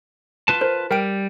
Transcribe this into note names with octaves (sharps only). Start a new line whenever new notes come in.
F4 B4 A5
A#4 C5
G3 A#4 G5 D7